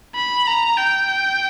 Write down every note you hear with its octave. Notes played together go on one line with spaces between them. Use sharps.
B5
A#5
G5